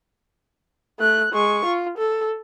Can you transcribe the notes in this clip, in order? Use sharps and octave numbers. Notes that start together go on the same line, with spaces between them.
A3 F#6
G#3 C#6
F4
A4